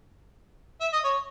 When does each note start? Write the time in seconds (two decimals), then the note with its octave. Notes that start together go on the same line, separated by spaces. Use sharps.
0.81 E5
0.92 D#5
1.04 C#5